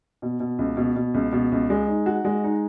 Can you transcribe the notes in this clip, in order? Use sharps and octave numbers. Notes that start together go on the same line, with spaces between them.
B2
B2
C#2
B2
B2
C#2
B2
C#2
G#3
D#4
F#4
G#3
D#4